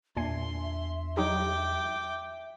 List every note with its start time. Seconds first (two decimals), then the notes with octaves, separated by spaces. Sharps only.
0.17 E2 A#2 A3 D4 E5 G#5 C6 C7
1.17 F#3 D#4 G4 G5 D6